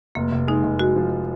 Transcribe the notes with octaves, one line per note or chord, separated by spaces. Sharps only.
F1 A#3
F1
G#3 D#4
F1
G#3 F#4
F3